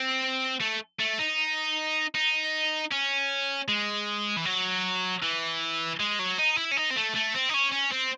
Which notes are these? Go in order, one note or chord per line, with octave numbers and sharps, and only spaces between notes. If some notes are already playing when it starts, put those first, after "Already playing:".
Already playing: C4
A3
A3
D#4
D#4
C#4
G#3
E3
F#3
E3
G#3
F#3
D#4
E4
C#4
D#4
C4
A3
A3
C4
D#4
C#4
C#4
C4